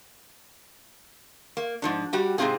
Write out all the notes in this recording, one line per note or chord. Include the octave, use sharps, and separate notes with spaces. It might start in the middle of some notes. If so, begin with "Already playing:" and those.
A#3
G#2 F3 D4
G3 F#4 G4
G#2 C3 E3 C4 F4 G#4